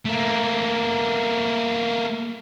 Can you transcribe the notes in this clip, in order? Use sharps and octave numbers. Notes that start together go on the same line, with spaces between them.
A3 A#3